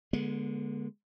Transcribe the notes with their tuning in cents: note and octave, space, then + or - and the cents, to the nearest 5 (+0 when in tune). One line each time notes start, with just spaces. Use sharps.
D3 +0 G#3 +0 B3 -40